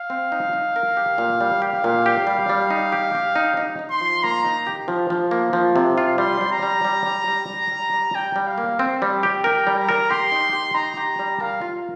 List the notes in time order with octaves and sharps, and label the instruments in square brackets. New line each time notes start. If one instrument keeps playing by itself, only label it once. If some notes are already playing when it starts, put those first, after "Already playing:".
Already playing: [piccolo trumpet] F5
[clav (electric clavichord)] C4
D#4
D#4
A#4
G4
A#2
G3
[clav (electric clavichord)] G4 [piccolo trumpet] F5
[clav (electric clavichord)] A#2
G4
G3
G3
D#4
G4
G4
D#4
D#4
D#4
[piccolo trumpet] C6
[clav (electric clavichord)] F3
[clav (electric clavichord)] A#3 [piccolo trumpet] A#5
[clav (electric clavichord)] D#4
G4
F3
F3
A#3
F3
C3
F4
[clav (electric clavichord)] G3 [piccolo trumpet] C6
[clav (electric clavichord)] G3
[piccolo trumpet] A#5
[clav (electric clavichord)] G3
G3
G3
G3
G3
G3
G3
[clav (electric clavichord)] G3 [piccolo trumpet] G5
[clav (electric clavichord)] G3
[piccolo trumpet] F5
[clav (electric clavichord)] A#3
C4
G3
G4
[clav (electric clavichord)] A#4 [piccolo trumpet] G5
[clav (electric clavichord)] G3
[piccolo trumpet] A#5
[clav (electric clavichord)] A#4
[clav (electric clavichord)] G4 [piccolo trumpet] C6
[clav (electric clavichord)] D#4
G4
[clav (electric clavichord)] D#4 [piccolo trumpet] A#5
[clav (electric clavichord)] G4
G3
[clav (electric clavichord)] A#4 [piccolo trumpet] F5
[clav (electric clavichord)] F4